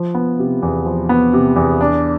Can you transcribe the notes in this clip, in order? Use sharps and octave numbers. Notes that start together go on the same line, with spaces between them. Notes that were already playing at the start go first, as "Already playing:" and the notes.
Already playing: F3
B3
C3
E2
F3
B3
C3
E2
D4